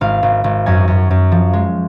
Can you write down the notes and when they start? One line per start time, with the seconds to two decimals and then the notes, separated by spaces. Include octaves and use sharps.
0.01 G#1 F5
0.23 G#1
0.44 G#1
0.66 F#2 G#5
0.88 F#2
1.11 F#2
1.32 F3
1.53 G#3